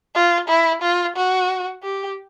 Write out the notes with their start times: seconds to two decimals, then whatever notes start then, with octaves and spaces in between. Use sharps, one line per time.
0.15 F4
0.48 E4
0.82 F4
1.16 F#4
1.83 G4